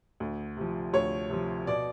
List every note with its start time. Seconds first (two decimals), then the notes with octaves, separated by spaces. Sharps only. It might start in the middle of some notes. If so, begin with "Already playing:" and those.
0.20 D2
0.57 C3 F3
0.93 D2 C#5
1.29 C3 F3
1.67 B2 D5